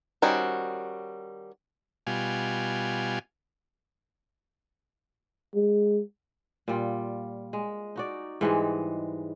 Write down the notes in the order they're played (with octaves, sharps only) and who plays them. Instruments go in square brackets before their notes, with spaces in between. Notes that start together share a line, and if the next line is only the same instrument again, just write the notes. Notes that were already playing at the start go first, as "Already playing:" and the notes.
[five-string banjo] D#3 G3 C#4 F#4 C5
[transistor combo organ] B2 G3 F4 G#5
[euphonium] G#3
[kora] A#2 G3 F4
G#3
D#4 F#4 D5
G#2 E3 G3 G#3